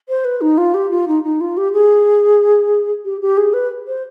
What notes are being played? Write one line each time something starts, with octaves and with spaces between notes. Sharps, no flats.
C5
B4
D#4
F4
G4
F4
D#4
D#4
F4
G4
G#4
G4
G4
G#4
B4
C5